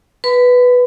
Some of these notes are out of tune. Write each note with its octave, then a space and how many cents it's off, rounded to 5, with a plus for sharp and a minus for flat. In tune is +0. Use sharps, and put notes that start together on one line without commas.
B4 +0 B5 +40